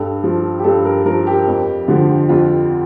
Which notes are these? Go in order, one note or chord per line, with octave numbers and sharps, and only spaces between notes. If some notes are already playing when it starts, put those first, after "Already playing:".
Already playing: G2 A4
F3
G4
G2 A4
A#4
F3 A#4
G4
F2
D3 F3
F2 F4